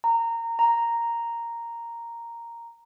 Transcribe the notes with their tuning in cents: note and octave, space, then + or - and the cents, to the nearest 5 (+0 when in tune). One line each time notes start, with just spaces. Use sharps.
A#5 -15
A#5 -5